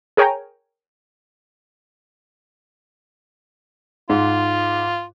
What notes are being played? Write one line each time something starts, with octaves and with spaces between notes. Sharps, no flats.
G#4 A#4 C#5 G5 G#5 A#5
G#2 F4